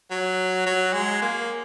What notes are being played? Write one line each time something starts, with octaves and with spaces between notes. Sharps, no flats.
F#3
F#3
G#3
A#3